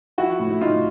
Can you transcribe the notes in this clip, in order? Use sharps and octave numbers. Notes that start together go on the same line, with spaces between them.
F3 E4 F#4
A2
E4
A2 D#4 F4